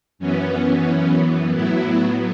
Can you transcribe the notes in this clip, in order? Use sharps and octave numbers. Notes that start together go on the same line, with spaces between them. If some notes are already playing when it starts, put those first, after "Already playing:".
F#2 E3 B3 C#4
A2 F#3 B3 E4